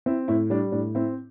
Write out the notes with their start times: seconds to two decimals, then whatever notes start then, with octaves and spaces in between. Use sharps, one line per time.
0.06 C4 E4
0.28 A2 E4
0.50 G3 D4
0.72 A2 D4
0.95 C4 E4